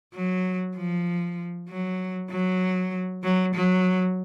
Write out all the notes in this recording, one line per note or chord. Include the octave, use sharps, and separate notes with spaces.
F#3
F3
F#3
F#3
F#3
F#3